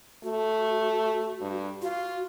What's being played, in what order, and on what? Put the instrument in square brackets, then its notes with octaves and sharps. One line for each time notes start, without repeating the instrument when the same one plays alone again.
[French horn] A3 [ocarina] F#4
[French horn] G2
[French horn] F4 [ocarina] F#4